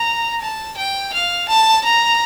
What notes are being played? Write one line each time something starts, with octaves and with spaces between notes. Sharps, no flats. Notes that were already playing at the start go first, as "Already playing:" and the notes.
Already playing: A#5
A5
G5
F5
A5
A#5